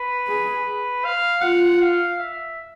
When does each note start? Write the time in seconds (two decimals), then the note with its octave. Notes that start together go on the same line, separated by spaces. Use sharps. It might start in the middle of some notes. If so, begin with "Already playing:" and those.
Already playing: B4
0.27 G#4
1.04 F5
1.42 F4 F#5
1.81 F5
2.19 E5